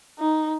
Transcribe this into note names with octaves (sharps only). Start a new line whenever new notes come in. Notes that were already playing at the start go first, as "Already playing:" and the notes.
D#4